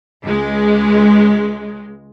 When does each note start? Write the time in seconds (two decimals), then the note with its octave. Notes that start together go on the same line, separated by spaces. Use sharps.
0.23 C#2 G#3